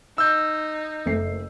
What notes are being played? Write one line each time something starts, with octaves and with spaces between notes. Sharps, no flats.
D#4 E6 G6
F#1 A3 C7